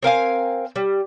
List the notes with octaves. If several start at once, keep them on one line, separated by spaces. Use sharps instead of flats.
C4 A#4 F5 G#5
G3